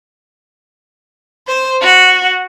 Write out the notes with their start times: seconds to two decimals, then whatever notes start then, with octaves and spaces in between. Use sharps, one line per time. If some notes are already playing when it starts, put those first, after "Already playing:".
1.47 C5
1.81 F#4